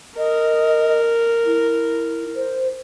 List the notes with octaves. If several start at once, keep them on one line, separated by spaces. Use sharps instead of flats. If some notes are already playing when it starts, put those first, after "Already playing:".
A#4 D#5
E4
C5